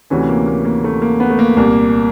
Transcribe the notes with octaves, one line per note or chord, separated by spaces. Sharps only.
D2 C3 E3 C#4
A#3
A#3
A#3
A3
A#3
B3
A3
A#3
C2 A#2 A#3